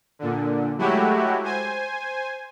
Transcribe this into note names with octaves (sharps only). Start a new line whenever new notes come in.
A#2 D3
F#3 G#3 A3 E4 F#4 G4
C5 G#5